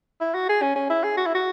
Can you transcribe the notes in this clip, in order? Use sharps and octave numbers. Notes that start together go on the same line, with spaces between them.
E4
F#4
G#4
C#4
C#4
E4
G#4
F#4
E4
F#4